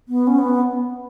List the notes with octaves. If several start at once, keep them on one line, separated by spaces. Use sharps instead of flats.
B3
C#4
B3